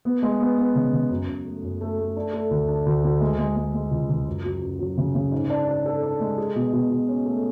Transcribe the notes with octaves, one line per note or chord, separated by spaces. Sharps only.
B3
G#3
B3
B3
C#3
C#3
F#2
F#2
A3
F#2
A3
A3
D4
A3
D2
D4
D2
D2
G#3
G#3
G#3
G#3
C#2
C#2
F#2
F#3
F#2
F#3
C#3
C#3
G#2
D4
D4
A4
D4
G#3
G#4
B2
B2
B2
C#4
A3